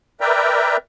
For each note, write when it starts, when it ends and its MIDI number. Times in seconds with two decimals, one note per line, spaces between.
0.21 0.77 70
0.21 0.77 71
0.21 0.77 74
0.21 0.77 76
0.21 0.77 79
0.21 0.77 82